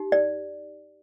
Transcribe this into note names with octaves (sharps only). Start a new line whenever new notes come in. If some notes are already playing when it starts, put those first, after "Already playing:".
Already playing: D#4 G4
D5